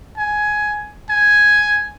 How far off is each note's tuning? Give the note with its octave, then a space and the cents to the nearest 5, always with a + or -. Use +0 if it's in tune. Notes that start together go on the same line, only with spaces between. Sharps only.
G#5 +15
G#5 +5